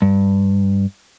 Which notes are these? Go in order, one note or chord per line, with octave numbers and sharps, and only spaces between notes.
G2